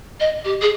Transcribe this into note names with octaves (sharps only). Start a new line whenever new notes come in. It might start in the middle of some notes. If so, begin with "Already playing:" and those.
D#5
G4
G#4